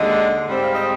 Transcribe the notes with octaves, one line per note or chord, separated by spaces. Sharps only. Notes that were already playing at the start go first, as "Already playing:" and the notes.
Already playing: D#2 D3 G#3 D4 D#5
G#2 G3 C4
F5
D#5